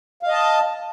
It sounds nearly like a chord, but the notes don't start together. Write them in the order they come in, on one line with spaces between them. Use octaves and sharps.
F5 D#5 A5